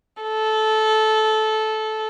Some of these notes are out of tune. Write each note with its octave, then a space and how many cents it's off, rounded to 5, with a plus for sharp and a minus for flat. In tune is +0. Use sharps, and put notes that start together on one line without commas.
A4 -15